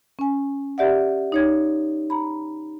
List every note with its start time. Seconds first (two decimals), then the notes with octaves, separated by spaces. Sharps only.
0.19 C#4 G#5
0.78 G4 D5 E5 F#5
1.32 D#4 C#5 G#6
2.10 A#5 B5